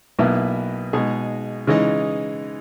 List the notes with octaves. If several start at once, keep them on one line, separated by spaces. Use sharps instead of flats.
B1 B2 A#3 E4 B4
B2 G#3 D#4 G#4
C#3 E3 G#3 D#4